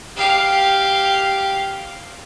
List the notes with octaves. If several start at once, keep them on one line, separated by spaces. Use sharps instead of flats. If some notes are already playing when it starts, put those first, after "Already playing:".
G4 F5